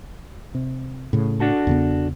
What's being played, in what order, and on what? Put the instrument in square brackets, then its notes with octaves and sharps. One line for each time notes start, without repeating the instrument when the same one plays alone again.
[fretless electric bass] C3
A2 C#3
[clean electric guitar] D4 F#4 A4
[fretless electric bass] E2 C#3 B3